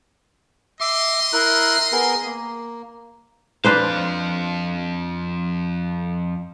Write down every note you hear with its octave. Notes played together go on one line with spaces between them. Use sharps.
D#5 E5 C6 D6
E4 A#4 F#6
B3 G#4 A#4
A#3
F2 D4 B4 C5 F5